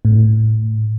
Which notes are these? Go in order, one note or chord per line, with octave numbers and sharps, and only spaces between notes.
A2